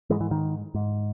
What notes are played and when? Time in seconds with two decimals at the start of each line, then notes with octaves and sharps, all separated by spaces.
0.10 G#2 E3 G#3
0.21 E3
0.31 D#3
0.75 G#2